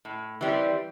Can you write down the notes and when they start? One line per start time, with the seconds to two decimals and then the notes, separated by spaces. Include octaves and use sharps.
0.05 A2
0.41 E3 G3 C4